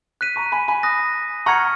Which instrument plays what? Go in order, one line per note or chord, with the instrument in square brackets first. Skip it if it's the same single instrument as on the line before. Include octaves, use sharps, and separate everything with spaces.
[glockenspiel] F#6 B6 D#7
[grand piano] A#5 C#6
G#5 B5
G#5 B5
[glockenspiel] D#6 F#6 A#6
[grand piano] F#5 A#5 [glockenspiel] C#6 F6 G#6 C#7